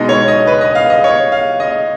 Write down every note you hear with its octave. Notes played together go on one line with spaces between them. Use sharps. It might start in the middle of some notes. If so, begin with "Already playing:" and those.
Already playing: B2 G#3 D#4 D#5
C#5
D#5
B4
D#5
F5
D#5
C#5
F5
D#5